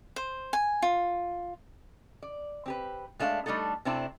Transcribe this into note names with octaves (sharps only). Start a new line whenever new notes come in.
C5
G#5
F4
D5
C4 G4 B4
G#3 A3 D4 E5 F5
G3 A3 D4 D#4 A4
C3 A3 C4 D4 E4